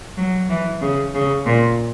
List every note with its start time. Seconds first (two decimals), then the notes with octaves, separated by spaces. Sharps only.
0.17 F#3
0.50 E3
0.82 C#3
1.15 C#3
1.46 A#2